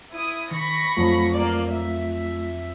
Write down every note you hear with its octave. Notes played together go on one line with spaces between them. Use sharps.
E4 D#6
D#3 B5 C#6 A#6
F2 F#3 A3 F4 D#6
A#3 D5
E5